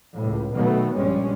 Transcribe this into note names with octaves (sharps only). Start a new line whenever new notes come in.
C#2 A2
B2 D#3 F#3 A3 B3
A#1 G2 G3 G#3 C#4